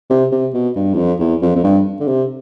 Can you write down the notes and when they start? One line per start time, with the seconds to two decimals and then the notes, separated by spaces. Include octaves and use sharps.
0.10 C3
0.32 C3
0.54 B2
0.76 G2
0.93 E2
0.98 F2
1.20 E2
1.42 F2
1.55 F2
1.64 G2
2.00 D3
2.08 C3